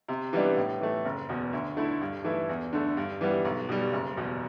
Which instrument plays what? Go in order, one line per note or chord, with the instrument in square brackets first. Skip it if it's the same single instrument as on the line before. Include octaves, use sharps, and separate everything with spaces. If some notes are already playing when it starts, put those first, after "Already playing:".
[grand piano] C3
E3 G3 B3 D4
A2
E3 A3
F#1
E2 B2
D2
D3 A3 E4
G2
E3 A3 E4
E2
D3 A3
G2
E3 G3 B3
B1
B2 G3
F#1
E2 B2